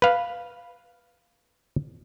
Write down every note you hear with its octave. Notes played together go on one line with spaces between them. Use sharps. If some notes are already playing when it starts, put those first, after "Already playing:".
B4 F5